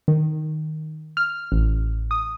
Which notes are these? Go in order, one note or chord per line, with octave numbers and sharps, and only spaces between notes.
D#3
F6
A1
D#6